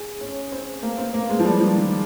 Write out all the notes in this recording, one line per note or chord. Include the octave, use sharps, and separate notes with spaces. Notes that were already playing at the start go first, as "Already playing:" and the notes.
Already playing: G#4
C#4
C4
A#3
C4
A#3
G#3
F3
G3
F3
D#3